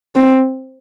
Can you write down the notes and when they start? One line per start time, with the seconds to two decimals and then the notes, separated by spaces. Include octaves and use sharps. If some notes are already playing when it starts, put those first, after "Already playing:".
0.16 C4